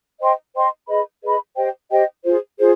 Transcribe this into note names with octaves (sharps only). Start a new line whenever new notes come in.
C5 D#5 G5 C6
C5 D#5 G5 C6
G#4 B4 D#5 B5
G#4 B4 D#5 B5
G4 C5 D#5 G5
G4 C5 D#5 G5
F4 G#4 C5
F4 G#4 C5